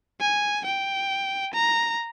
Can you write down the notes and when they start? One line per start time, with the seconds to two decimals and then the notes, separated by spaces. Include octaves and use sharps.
0.21 G#5
0.65 G5
1.54 A#5